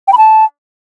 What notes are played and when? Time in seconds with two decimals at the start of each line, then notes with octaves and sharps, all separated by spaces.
0.08 G5
0.13 B5
0.18 A5